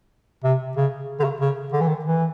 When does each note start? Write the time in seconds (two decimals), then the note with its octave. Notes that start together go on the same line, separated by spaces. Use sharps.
0.44 C3
0.77 C#3
1.20 D3
1.24 C#3
1.41 C#3
1.73 D3
1.81 E3
1.89 D#3
2.05 E3